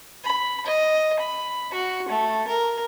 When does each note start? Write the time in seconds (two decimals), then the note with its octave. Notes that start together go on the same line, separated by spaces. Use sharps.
0.24 B5
0.66 D#5
1.19 B5
1.74 F#4
2.09 A3
2.48 A#4